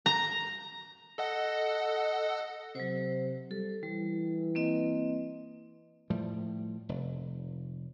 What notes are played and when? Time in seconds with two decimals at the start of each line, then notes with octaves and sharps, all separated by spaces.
0.06 A#5
1.18 A4 D#5 F#5
2.75 C3 F#3 C5
3.51 G3 A4
3.83 E3 G3
4.55 A#3 C4 D#5
6.10 A2 F3 G3
6.89 F1